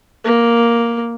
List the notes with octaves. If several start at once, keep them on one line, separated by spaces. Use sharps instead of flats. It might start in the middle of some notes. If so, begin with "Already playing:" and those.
A#3